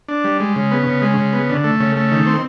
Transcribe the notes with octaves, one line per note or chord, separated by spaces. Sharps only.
D4
G3
G#3
C#3
B3
C#3
G#3
C#3
B3
D3
A3
C#3
A3
D#3
C4